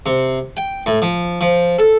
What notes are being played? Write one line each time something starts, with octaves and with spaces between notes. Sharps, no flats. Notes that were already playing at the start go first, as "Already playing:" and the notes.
C3
G5
A2
F3
F3
A4